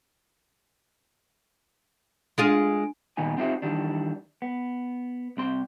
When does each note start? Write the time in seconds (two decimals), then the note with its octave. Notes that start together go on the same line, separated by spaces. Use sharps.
2.38 G#3 D4 F4 G#4 G#5 D7
3.17 A#2 D#3 B3 D#4 G#5
3.38 C4 D#4 F4 G4 C5 E5
3.62 D#3 E3 G3 D4
4.42 B3
5.37 C2 C4 C6